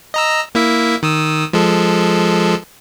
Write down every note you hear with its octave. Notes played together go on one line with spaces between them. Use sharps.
D#5 A#5 E6
A#3 E4 E5
D#3 D#6 E6
F3 G#3 A4